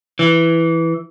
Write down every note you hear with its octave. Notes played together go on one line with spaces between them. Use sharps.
E3